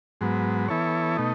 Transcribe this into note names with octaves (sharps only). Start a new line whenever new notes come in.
G#2 F#3 B3
E3 B3 E4 A4 C#5
B2 A3 D#4